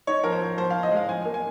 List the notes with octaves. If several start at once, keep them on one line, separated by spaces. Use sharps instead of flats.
D#4 C#5
F3 A#4
C5
F3
F3 C5
F5
F3
D#5
G#3 F5
F3 G#5
A#3
G#5